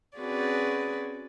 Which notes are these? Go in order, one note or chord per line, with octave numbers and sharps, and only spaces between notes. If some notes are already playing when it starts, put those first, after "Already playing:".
C4 C#4 F#4 G#4 B4 D5